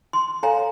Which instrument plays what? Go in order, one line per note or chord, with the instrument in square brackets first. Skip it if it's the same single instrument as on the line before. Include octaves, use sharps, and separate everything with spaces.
[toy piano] C6
[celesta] A4 C#5 F5 G#5 [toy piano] A#5